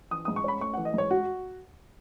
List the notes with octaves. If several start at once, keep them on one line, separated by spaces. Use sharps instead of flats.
E3 D#6
G#2 D#6
C#6
C#4 B5
A3 C#6
E3 F#5
D#5
G#2 C#5
F#4